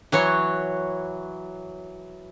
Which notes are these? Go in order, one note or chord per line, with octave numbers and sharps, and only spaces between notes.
E3 F#3 C#5